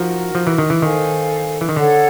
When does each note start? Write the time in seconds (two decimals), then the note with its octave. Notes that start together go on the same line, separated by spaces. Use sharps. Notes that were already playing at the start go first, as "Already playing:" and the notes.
Already playing: F3 D#4 F#4 A#4
0.35 F3
0.47 E3
0.58 D#3
0.70 E3
0.82 D#3 A4 C5 F5 G#5
1.61 E3
1.69 D#3
1.76 D3 A4 C#5 F#5